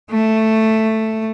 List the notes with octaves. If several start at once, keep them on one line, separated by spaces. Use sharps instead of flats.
A3